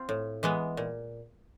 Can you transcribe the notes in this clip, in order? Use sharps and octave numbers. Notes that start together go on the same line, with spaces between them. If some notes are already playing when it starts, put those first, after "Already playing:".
Already playing: C4 F4
A2
E3 G#3 B3
A#2